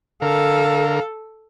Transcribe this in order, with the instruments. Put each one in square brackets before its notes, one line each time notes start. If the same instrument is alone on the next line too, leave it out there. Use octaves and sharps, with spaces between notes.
[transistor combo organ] D3 A#4 [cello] A4 [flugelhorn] F5